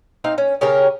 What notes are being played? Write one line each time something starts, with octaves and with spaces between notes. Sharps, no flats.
C4 D#4 F5
C#4
C#3 C#4 G4 A#4